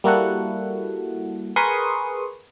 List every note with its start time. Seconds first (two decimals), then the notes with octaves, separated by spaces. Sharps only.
0.04 G3 A#3 E4 F#4 A4 F#5
1.56 G#4 A#4 B4 C6 C#6 D#6